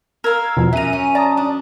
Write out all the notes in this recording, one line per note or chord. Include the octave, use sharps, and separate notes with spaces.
A#4 F5 E6 G#6
E2 B2 F3
F#2 E5 A#5 D#7
C#4
D5 A5 A#5 D#6
D4